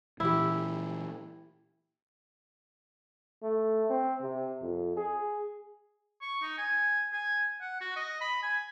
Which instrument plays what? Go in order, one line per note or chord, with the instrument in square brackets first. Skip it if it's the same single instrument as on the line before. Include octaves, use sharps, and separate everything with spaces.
[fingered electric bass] A#2 E3 [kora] E4 G4
[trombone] A3
C4
C3
F2
G#4
[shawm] C#6
D#4
G#5
G#5
F#5
F#4
D#5
B5
G#5